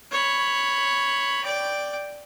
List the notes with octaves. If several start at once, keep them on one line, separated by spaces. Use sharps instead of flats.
C#5 B5
D5 G5